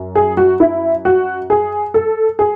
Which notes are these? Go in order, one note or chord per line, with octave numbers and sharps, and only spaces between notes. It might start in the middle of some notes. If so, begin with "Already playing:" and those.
Already playing: F#2
G#4
F#4
E4
F#4
G#4
A4
G#4